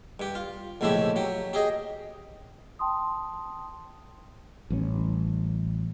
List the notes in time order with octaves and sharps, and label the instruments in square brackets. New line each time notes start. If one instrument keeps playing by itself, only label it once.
[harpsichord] G2 G4
F4
A#1 G#2 C#3 A3 E4 G4
F#3 G4
G4 G#4 D#5
[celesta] G5 A5 C6 D#6
[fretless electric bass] A1 G3 A#3 C#4